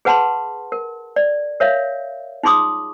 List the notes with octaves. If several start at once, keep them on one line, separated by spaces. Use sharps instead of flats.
G#4 B4 F#5 A5 B5 C6
A#4
D5
A#4 C#5 E5 F5
D#4 F4 G#4 C6 D6 D#6